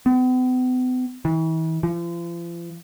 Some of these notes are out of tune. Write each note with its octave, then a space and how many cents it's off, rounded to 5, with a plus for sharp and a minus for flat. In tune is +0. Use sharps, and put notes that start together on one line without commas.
B3 +45
E3 -40
F3 -40